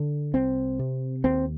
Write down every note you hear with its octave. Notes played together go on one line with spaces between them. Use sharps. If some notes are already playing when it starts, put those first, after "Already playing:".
Already playing: D3
C2 C4
C3
D#2 C4